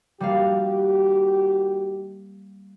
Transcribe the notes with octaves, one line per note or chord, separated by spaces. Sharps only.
D#3 G3 A#3 F#4 G4 F5